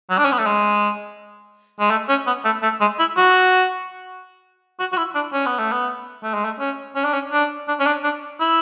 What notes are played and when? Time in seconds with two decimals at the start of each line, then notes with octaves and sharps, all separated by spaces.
0.10 F#3
0.18 D4
0.25 C#4
0.32 B3
0.39 A3
0.46 G#3
1.80 G#3
1.90 A3
2.09 C#4
2.27 B3
2.45 A3
2.63 A3
2.81 G#3
2.99 E4
3.17 F#4
4.79 F#4
4.92 F#4
4.97 E4
5.15 D4
5.33 C#4
5.46 B3
5.59 A3
5.72 B3
6.23 A3
6.34 G#3
6.45 A3
6.60 C#4
6.96 C#4
7.05 D4
7.13 C#4
7.32 D4
7.68 D4
7.80 C#4
7.86 D4
8.04 D4
8.40 E4